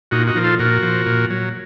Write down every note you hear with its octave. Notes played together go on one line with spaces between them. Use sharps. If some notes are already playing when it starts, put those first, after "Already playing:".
A#2 D#4 F#4
D#4 F#4
F3 A#4
F4 A4
A#2 F#4 A#4
F3
A#2
F#3